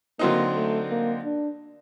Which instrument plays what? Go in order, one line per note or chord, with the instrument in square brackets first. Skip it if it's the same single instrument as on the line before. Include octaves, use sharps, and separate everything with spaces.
[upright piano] D3 F#3 C4 D#4 [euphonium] A#3
[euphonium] A3
A#3
D4